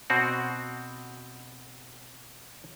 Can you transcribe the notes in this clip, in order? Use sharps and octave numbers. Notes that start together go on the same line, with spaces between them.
B2 C4 F#4